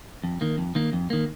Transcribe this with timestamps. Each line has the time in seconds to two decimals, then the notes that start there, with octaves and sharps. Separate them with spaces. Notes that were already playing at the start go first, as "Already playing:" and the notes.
0.24 F2
0.41 D#3 A#3
0.58 F2
0.75 D#3 A#3
0.93 F2
1.10 D#3 A#3